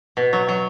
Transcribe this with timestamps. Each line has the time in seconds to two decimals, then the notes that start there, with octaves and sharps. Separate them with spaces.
0.17 B2
0.33 F#3
0.48 F#3